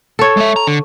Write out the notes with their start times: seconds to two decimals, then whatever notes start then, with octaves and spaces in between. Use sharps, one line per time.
0.19 A4 C#5
0.37 G#3 E5
0.56 A#5
0.67 D3